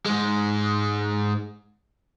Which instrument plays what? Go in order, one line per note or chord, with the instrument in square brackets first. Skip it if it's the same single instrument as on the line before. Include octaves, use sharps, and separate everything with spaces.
[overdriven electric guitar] G#2 G#3